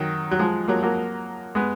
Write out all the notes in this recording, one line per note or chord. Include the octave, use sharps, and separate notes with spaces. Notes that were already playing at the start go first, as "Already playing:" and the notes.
Already playing: D#3 F#3
F#3
F3 G#3
F#3 A#3
F#3 A#3
G#3 B3